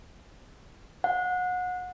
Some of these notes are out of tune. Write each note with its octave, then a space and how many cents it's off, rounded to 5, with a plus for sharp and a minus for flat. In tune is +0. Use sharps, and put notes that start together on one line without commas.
F#5 -30